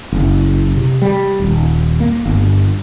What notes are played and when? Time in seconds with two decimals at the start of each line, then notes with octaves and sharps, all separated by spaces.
0.12 F#1
0.76 C3
1.02 G3
1.40 D#1
2.00 A#3
2.26 G1